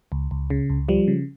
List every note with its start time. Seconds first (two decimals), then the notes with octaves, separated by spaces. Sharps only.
0.12 C#2
0.31 C#2
0.50 C#3
0.70 C#2
0.89 F3 G3
1.08 C#3